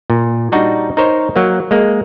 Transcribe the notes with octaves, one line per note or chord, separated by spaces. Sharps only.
A#2
G3 D4 D#4 F#4
D#4 A#4 C5 C#5
F#3 A#3
G#3 A#3